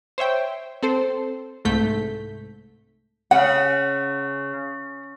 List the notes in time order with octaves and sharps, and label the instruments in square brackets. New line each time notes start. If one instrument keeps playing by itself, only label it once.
[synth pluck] C5 C#5 E5 G5
C4 A4 C5
C2 G#2 A3 G6 B6
[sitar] C#3 [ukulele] F#5